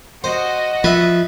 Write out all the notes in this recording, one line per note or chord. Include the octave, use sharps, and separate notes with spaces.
F#4 C5 D#5
F3 B4 E5